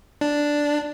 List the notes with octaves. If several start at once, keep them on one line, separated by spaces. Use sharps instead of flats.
D4